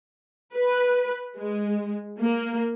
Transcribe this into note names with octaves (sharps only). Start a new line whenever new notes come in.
B4
G#3
A#3